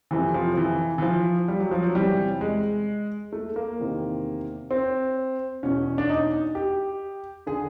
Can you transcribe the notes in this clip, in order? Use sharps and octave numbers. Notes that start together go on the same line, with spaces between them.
F2 C3 E3
F3
E3
E3
F3
G3
F#3
F3
F#3
E2 C3 E3 G3
G#3
A3
A#3
E2 C3 D#3
C4
E2 B2 C#4
D4
D#4
G4
D3 G#4